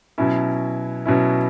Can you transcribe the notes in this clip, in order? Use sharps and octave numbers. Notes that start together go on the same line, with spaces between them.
B2 F#3 C#4 E4
B2 F#3 C#4 E4